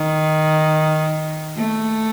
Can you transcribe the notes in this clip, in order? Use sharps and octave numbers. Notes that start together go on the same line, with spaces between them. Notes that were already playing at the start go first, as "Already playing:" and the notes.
Already playing: D#3
A3